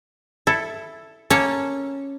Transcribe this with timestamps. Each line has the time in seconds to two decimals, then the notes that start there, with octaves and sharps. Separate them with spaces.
0.47 E4 A4
1.30 A#3 C#4 A4 C#5 A5